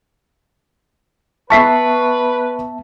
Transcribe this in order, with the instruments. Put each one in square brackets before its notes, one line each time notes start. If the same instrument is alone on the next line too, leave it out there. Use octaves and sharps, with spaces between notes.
[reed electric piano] B3 E5 A5 [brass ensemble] B4 [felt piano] C#6 B6 C7